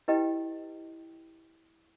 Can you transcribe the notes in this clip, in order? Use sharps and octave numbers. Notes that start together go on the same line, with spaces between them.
E4 G4 B4 D#5 G5